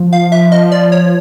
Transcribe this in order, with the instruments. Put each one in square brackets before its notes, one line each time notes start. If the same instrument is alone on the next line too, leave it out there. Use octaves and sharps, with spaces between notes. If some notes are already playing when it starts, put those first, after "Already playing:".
Already playing: [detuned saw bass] F3
[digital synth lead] F5
E5
D#5
D5
C#5